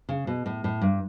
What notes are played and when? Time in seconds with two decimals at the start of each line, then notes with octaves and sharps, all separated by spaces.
0.09 C#3
0.27 B2
0.46 A2
0.64 A2
0.82 G2